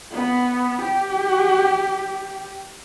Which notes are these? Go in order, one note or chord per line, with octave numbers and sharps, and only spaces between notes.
B3
G4